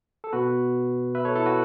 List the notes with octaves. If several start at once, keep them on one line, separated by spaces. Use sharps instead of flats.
A4
B2 B3 F#4 B4
B4 E5
A4 C#5
E4 A4
F#4 B4